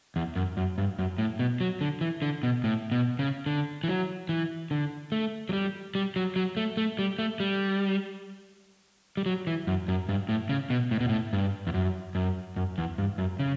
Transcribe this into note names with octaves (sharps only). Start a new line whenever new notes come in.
E2
F#2
F#2
G2
F#2
A2
B2
F#3
D3
E3
D3
B2
A2
B2
C#3
D3
E3
F#3
E3
D3
A3
F#3
G3
G3
F#3
F#3
A3
A3
G3
A3
G3
G3
F#3
E3
F#2
F#2
G2
A2
C#3
B2
A2
B2
A2
G2
E2
F#2
F#2
F#2
E2
G2
F#2
C#3